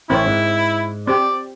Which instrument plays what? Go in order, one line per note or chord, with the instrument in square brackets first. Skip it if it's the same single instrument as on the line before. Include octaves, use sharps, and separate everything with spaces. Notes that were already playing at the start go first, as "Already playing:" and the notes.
[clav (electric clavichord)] A1 C#5 [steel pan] C4 A#4 [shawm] E4
[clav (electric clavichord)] G#2
[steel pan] C4 G4 [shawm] D5